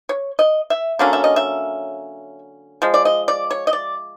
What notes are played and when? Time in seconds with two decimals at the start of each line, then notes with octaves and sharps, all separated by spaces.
0.09 C#5
0.39 D#5
0.70 E5
0.99 D3 F#3 A#3 C#4 F5
1.13 E5
1.24 D#5
1.36 E5
2.82 F3 G#3
2.94 D5
3.05 D#5
3.28 D5
3.51 C#5
3.67 D#5
3.73 D5